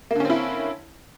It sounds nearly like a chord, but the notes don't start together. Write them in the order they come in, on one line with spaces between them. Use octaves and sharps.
A#3 D3 C#4 C4 E4